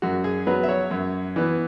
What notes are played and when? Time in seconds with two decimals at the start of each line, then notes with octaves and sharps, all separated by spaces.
0.02 F#2 F#4
0.24 G#4
0.47 F#3 B3 B4
0.63 E5
0.69 C#5
0.91 F#2
1.36 E3 B3